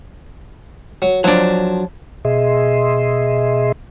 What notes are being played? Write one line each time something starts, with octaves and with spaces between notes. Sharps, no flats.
F#3
F3 F#3 D4
B2 G#4 D#5 E5 C6